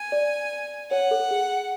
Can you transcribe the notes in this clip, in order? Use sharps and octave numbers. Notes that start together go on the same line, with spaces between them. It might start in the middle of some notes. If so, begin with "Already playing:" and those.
Already playing: G#5
D5
C#5 F#5
A4
G#4